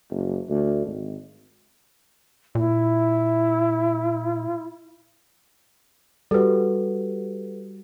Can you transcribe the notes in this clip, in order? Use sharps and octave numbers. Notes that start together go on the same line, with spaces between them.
F#1
D2
G#1
A#2 E4
G3 F#4 A4 B4